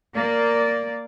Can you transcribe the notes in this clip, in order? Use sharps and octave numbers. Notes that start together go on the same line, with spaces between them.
A#3 D5